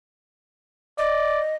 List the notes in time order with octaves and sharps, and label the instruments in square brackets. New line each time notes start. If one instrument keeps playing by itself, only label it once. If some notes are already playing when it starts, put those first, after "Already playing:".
[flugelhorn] D5 [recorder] D#5